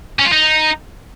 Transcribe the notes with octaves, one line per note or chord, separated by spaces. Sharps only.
C#4
F4
D#4